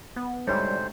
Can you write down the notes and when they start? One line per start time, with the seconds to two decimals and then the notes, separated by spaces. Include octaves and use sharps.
0.16 B3
0.47 D2 G#2 C3 G3 C5 C#5